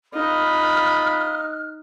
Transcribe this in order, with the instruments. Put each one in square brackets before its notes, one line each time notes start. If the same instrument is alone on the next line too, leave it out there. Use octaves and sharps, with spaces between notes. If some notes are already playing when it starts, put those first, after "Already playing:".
[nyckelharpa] D#4 [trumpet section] F4 B5 [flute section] F6 F#6